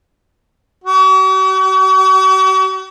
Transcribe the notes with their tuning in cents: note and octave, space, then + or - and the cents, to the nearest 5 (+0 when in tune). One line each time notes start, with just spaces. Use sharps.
F#4 +45